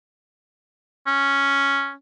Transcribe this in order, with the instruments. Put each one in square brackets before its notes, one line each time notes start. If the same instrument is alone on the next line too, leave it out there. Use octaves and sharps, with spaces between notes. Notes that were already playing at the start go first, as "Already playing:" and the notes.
[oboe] C#4